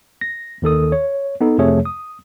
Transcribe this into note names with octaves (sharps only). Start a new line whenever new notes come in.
A#6
D#2 D#3 A4 D#6
C#5
B3 D#4 A4
F2 C3 F3 A3 G#4 C#5
D#6